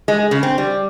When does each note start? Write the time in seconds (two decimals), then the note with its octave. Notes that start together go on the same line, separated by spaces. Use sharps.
0.08 G#3
0.31 C#3
0.43 C4
0.58 G3